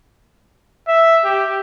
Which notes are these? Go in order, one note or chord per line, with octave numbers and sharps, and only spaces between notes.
E5
G4